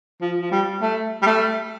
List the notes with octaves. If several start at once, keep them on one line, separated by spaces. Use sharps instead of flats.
F3
F3
G3
A3
G3
A3